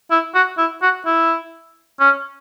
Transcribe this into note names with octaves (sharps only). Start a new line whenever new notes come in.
E4
F#4
E4
F#4
E4
C#4